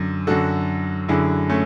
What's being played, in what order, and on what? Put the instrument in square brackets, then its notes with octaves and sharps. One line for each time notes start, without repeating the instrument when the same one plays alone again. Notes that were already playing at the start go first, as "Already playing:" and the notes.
Already playing: [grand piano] F#2 D3
F#2 D3 F#4 A4
F#2 D3 E4 G#4
A3 C#4